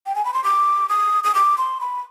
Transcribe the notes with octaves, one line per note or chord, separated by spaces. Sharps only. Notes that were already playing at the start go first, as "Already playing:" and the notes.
G5
G#5
B5
C6
D6
D#6
D#6
D6
C6
B5